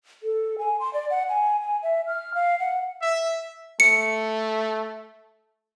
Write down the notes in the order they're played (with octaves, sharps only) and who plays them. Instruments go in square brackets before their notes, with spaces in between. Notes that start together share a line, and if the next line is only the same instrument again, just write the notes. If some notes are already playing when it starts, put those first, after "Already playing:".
[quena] A4
G#5
C6
D5
F#5
G#5
G#5
E5
F6
F5
F#5
[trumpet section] E5
[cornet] A3 [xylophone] C#7